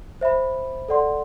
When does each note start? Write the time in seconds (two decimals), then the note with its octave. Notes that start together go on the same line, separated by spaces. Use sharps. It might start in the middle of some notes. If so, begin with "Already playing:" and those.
0.21 C5 E5 B5
0.89 A4 D5 F#5 C6